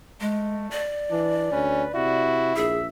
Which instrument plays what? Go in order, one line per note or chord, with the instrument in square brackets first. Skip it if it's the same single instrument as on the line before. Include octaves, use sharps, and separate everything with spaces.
[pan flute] G#3 [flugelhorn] A3
[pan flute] D5
[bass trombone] E3 [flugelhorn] D4
[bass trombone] D2 [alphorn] C#4 [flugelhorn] B4
[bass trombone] C3 [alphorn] E4 [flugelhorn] F#4
[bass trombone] A#1 [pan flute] G#4 [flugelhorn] E5